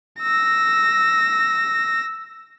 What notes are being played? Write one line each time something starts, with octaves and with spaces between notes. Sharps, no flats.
E6 A#6